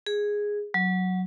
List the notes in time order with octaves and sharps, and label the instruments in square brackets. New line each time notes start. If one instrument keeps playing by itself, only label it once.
[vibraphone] G#4
F#3